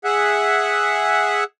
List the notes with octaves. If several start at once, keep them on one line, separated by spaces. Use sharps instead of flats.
G#4 E5 F#5